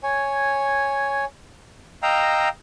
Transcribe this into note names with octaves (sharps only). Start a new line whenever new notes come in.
C#5 G#5
D#5 F5 G5 A#5 E6